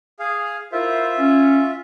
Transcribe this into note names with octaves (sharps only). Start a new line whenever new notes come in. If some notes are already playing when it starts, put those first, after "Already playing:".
G#4 F5
E4 F4 A#4 C5 E5
C#4